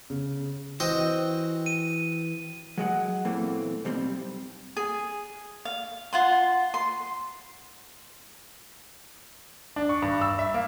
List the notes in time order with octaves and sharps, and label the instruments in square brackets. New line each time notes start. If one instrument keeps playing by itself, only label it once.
[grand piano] C#3
[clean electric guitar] E3 [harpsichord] C4 F#4 G5 [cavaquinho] D#5
[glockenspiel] D#7
[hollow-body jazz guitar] F#3 G#3 F#5
E2 A#2 E3 A3 C4
B1 G3 C4
[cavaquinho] G#4
F5
F4 F#5 C6
C6
[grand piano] D4
C#6
G2
E6
E5
A#3